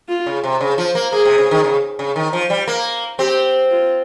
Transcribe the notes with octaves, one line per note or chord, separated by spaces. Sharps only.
F4
C#3
C3
C#3
F3
A#3
A#3 G#4
C3
C#3
D#3
C#3
C#3
D#3
F3
G3
A#3
C4 G4
F4